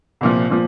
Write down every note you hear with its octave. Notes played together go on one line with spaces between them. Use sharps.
C2 A#2 F3
A#2 F3